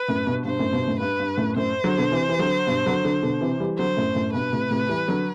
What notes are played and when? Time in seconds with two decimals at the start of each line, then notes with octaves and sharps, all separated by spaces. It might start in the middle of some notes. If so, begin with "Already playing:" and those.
Already playing: B4
0.08 F#2 A2
0.27 G2 B2
0.45 G2 B2 C5
0.59 F#2 A2
0.73 G2 B2
0.87 F#2 A2
1.00 G2 B4
1.20 G2
1.37 F#2 A2
1.56 F#2 A2 C5
1.84 D3 F#3
1.98 B2 D3
2.12 C3 E3
2.29 E3
2.39 D3 F#3
2.67 G2 B2
2.86 D3 F#3
3.05 D3 F#3
3.23 B2 D3
3.41 C3 E3
3.60 E3 G3
3.78 D3 F#3 C5
3.97 F#2 A2
4.15 F#2 A2
4.33 G2 B2 B4
4.53 A2 C3
4.71 A2 C3
4.89 E3 G3
5.08 D3 F#3